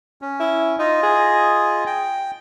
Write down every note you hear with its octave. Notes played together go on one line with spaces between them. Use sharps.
C#4
E4
D#4 F4 D#5
G#4
G5